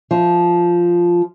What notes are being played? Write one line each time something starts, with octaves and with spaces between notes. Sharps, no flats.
F3